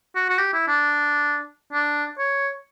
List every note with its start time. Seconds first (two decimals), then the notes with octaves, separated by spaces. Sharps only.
0.15 F#4
0.29 F#4
0.38 G4
0.53 E4
0.68 D4
1.73 D4
2.18 C#5